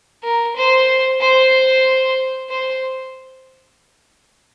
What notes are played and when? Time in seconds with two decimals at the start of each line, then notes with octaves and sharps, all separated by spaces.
0.23 A#4
0.56 C5
1.21 C5
2.49 C5